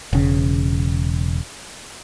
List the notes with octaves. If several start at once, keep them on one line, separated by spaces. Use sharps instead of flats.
E1 C#3